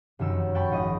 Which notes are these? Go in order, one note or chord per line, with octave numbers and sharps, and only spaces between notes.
F1 F#2 D#3 E6
F#5 G5 A5 B5 C#6
G#1 F3 D#5 D#6